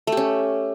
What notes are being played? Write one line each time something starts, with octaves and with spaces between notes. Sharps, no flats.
A3 C#4 G4